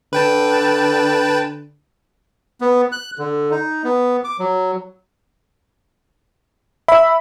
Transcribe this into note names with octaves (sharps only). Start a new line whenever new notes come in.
D3 B4 G5 A5
B3
F#6
D3
D#4
B3
D6
F#3
E5 B5